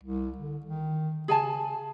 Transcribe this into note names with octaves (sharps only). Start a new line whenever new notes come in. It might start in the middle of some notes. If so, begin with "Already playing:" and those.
C2
D3
D#3
C#3 G#4 G#5 A5